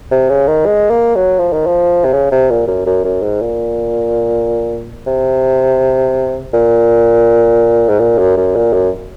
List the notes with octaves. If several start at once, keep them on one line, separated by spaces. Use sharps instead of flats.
C3
C#3
D#3
G#3
A#3
F#3
F3
D#3
F3
C3
C#3
C3
A#2
F#2
F#2
F#2
G#2
A#2
C3
A#2
G#2
A#2
F#2
F#2
A#2
F#2